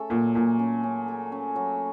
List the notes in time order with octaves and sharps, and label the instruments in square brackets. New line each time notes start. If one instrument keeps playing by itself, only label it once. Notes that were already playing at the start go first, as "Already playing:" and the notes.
Already playing: [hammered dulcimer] A3 C#4 A4
[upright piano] A#2 [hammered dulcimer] F#3
[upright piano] A#2 [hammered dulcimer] F#3
[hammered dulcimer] C#4
C#4
A4
C#4
F#3